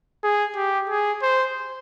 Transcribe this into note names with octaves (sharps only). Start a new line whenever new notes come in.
G#4
G4
G#4
C5